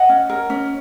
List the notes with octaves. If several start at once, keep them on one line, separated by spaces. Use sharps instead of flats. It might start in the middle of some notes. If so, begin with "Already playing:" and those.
Already playing: D#5 F#5
C#4
A#4
C#4